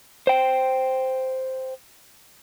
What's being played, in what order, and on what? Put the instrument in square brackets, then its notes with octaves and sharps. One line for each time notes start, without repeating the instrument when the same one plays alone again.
[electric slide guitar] C5 G5